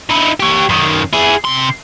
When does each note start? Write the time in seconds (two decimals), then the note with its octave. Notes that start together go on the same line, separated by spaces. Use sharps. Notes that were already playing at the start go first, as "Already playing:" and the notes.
0.10 D#4 E4
0.40 G4 C#5
0.69 F#2 D#3
1.13 E4 G#4
1.45 C3 C6